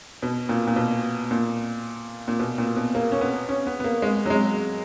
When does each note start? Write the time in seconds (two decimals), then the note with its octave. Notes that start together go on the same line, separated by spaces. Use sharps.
0.23 B2
0.49 A#2
0.67 A#2
0.76 B2
1.31 A#2
2.28 A#2
2.39 B2
2.58 A#2
2.77 B2
2.95 A#3
3.12 C#4
3.21 B3
3.49 C#4
3.67 B3
3.80 B3
3.84 A#3
4.02 G#3
4.26 F#3
4.30 G#3